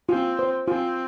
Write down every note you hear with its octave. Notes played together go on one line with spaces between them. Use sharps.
C4 F4
C5
C4 F4